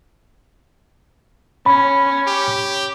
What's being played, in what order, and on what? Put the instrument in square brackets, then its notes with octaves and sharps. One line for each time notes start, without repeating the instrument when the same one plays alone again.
[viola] C#4 [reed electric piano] B5
[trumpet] G4